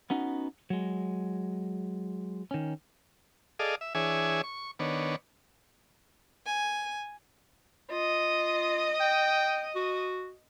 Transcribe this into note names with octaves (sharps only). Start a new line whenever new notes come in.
B3 C#4 D#4 F#4
F#3 G#3
D#3 C#4
G#4 A4 D5 D#5 F5
E5
E3 D4 G#4 C#5 E5 G#5
C#6
D#3 B3 D4 C#5
G#5
F4 D#5
G5
F#4